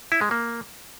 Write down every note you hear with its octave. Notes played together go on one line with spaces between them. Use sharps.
E4
G#3
A#3